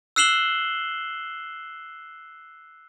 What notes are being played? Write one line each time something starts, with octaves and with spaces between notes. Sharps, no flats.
E6 F#6 C7 E7 F#7 G7